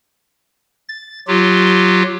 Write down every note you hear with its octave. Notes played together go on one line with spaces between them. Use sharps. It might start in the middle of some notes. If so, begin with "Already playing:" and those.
A6
F#3 F4 G4